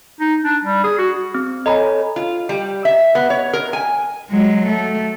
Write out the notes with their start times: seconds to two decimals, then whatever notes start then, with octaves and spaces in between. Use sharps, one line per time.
0.20 D#4
0.44 D4
0.65 G3
0.84 G#4
0.98 F#4
1.35 C4
1.66 A4 C#5 D#5 G#5 A#5 B5
2.16 F4
2.49 G3
2.85 E5
3.15 B3
3.30 C#5
3.53 A#4
3.73 G#5
4.30 F#3 G#3
4.67 A3